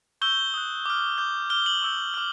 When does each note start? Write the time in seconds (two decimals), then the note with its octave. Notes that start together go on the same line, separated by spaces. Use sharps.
0.21 C#6 E6 G6 G7
0.54 D#6 F#6
0.86 D6 F6
1.18 D6 G6
1.50 D6 F6 G7
1.66 F#7
1.82 C#6 E6 G6
2.14 D6 F6